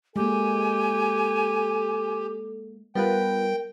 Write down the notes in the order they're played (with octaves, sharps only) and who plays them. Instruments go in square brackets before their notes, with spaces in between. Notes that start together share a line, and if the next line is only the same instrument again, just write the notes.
[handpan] G#3 A#3 [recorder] G4 [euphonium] A4 [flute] G#5
[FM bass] G3 [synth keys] B3 F4 B4 [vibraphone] A#4 [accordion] G5